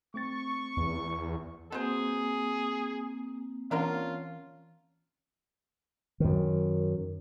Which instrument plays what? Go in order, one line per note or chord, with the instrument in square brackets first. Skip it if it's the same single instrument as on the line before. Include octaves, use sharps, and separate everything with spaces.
[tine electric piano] A3 C4 A6 [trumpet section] C#6
[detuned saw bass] E2
[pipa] B2 C5 [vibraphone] A#3 C4 [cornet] G#4
[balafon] E3 C#4 F#5 [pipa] D4 A#4 C#5 [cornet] F4
[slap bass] F#2 D#3